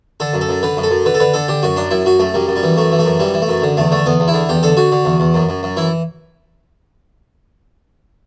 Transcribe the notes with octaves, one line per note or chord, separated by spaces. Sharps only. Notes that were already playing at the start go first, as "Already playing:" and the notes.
D3 A4
F#2
A4
F#2
D3 B4
F#2
A4
F#2
D3 B4
A4
D3 B4
D3 A4
D3 G4
F#2 F#4
F#2 D4
F#2 E4
F#2 F#4
F#2 A3
F#2 G3
F#2
G3
E3
F#2 A3
E3
A3
F#2
E3 G3
E3
A3
F#2
D3
E2 A3
D3 A3
E2 B3
E2
E4
D3
E2 G4
D3 A4
D3 F#4
D3
E2
E2
F#2
F#2
F#2
E3 E4